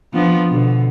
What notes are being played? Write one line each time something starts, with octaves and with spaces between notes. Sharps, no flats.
F3 B3 D4
B2 D3